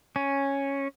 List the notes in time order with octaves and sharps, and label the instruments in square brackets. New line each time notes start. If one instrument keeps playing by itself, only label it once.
[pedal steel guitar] C#4